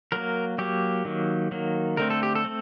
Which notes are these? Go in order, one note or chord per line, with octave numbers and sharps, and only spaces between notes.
F#3 A#3 A#4
F#3 A#3 G4
D#3 F#3 A#3
D#3 F#3 A#3
D3 A3 C4 A#4
A4
G4
A4
A3 C4